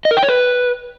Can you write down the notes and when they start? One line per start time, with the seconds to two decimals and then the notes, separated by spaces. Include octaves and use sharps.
0.05 D#5
0.11 A#4
0.17 G5
0.23 C#5
0.28 B4